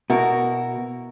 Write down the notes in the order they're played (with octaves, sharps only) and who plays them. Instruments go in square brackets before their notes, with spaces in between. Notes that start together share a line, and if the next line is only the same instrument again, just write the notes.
[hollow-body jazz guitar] B2 [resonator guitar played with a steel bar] E4 F#4 A#4